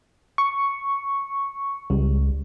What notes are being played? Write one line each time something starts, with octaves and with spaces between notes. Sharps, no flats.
C#6
C#2 G3